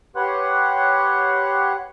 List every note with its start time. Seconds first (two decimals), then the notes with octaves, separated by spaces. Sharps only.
0.16 G4 B4 C#5 F#5 C6 F#6